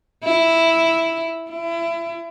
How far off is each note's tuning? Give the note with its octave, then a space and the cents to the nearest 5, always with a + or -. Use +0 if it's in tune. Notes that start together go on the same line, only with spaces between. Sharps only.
E4 +0
E4 +30